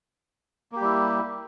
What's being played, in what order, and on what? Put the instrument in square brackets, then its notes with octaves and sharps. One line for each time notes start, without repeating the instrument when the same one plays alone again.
[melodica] A#3
G4
G3
E4